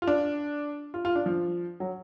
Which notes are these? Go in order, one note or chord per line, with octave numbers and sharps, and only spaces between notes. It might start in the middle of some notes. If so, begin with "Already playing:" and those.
F4
D4
F4
F4
D4
F3
F#3